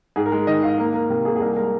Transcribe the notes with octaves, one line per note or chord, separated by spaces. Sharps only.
G#2 G#4
A#4
G#3
D#3 D#5
G#2 F5
A#3 A#4
A#3 A#4
C3 A#4
A#3 G#4
G#4
C2 A#4
G#3 A#4